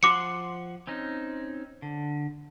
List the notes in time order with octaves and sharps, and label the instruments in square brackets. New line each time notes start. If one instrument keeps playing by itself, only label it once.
[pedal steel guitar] F3 F#5 C6 [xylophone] D6 C#7
[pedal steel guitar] C4 C#4 D#4
D3